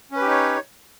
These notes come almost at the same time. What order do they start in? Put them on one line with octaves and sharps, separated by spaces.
C#4 B4 G4 D#4 C#5